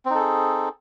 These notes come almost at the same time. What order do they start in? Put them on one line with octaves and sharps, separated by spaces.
C4 D#4 A4 G#4